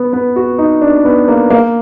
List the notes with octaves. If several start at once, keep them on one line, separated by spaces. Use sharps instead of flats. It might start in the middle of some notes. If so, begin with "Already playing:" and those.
Already playing: B3
B3
F#4
D#4
D4
B3
A#3
A#3